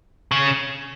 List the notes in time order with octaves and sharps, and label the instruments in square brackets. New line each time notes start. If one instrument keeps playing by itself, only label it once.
[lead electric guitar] C#3